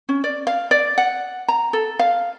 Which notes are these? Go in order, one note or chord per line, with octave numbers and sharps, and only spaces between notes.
C#4
D5
F5
D5
F#5
A#5
A4
F5